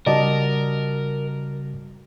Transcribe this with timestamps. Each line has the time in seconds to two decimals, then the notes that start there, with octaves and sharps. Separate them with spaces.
0.06 C#3 G3 F#4 A#4 D5 D#5 A5